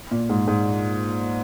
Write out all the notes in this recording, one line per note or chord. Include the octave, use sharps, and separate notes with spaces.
A#2
G#2
G#2